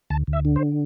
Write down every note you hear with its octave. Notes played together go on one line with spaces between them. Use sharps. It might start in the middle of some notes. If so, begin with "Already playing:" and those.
D2 A5
D2
E5
D3
C5